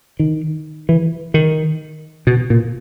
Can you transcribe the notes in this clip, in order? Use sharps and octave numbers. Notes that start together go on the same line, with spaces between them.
D#3
E3
D#3
B2
A#2